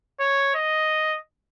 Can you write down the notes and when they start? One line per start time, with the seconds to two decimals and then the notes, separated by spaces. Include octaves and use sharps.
0.20 C#5
0.55 D#5